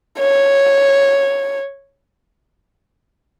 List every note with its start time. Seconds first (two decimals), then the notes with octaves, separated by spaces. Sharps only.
0.19 C#5